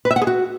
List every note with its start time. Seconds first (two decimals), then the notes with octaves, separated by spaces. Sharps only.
0.05 B4
0.11 E5
0.16 F#5
0.22 G#4
0.27 F#4